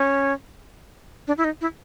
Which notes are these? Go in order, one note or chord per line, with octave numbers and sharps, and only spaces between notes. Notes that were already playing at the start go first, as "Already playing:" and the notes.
Already playing: C#4
D4
E4
D#4
E4